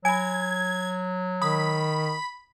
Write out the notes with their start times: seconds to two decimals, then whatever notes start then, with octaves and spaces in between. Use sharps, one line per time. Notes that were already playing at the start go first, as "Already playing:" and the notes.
0.05 F#3 G#5 B5 G#6
1.42 D#3 B5 D#6